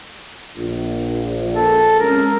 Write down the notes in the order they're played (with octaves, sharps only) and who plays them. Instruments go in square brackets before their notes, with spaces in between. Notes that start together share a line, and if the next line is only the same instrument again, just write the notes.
[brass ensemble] A#1
[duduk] A4
[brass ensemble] G#3 C4 C#4 [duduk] A#4